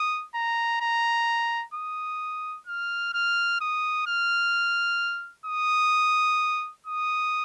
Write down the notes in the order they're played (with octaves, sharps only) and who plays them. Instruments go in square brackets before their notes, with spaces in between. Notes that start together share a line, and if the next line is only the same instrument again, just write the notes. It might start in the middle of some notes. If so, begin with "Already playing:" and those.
Already playing: [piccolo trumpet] D#6
A#5
A#5
D#6
F6
F6
D#6
F6
D#6
D#6